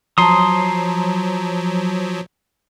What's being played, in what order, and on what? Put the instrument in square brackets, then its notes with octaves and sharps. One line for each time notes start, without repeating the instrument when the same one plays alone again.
[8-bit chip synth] F3 F#3 [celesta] A5 A#5 [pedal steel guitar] C6 D#6